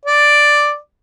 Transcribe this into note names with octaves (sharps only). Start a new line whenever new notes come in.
D5